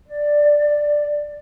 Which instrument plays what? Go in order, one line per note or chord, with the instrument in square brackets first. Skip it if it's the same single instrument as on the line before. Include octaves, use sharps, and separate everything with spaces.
[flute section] D5